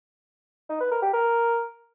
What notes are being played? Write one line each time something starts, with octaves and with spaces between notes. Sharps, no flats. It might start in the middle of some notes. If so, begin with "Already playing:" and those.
D#4
B4
A#4
G4
A#4